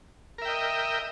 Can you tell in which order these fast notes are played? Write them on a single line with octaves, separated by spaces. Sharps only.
A#4 E5 G5 D#5